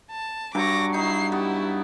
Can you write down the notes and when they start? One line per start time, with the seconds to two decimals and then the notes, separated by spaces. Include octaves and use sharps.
0.11 A5
0.55 G2 F#3 C#6 D6 A#6
0.94 D#4 E4 C7
1.32 B3 E4 G4